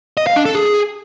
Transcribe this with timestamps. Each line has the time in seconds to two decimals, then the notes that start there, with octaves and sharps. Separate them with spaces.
0.17 D#5
0.27 F5
0.36 D4
0.45 A4
0.55 G#4